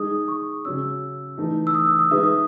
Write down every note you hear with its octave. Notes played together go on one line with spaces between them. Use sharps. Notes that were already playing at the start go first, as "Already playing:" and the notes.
Already playing: G#3 D#4 G#4 D#6
C#6
C#3 F#3 C#4 E6
E3 A3 D#4
E6
D#6
E6
D#6
G#3 D#4 G#4 B4 E5 D#6
D#6